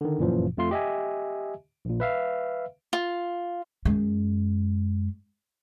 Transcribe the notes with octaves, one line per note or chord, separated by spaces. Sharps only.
D3 D#3
G1 F#2 A#2 E3 F3
F2 A3 F4 C6
G4 D#5 E5 G#5
A#1 A#2
B4 E5 F5
F4
F#2 G#3